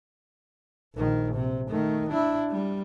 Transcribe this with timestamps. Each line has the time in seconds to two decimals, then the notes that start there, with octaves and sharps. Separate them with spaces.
0.94 A#1 D#3
1.34 C3
1.68 D#3 A3
2.09 D4 E4
2.50 G3